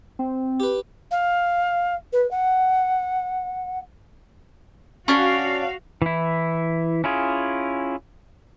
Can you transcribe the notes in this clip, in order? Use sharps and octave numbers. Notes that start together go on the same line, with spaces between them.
C4
G4 B4
F5
B4
F#5
C#4 D4 F#4 F5
E3 E4
C#4 E4 F4 G#4